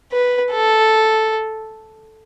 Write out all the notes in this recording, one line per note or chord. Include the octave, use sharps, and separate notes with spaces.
B4
A4